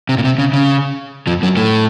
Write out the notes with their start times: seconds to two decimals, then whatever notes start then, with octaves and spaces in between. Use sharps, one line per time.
0.09 C3
0.18 A#2
0.24 C3
0.38 C#3
0.53 C#3
1.27 F2 F3
1.43 F#2 F#3
1.57 A2 A3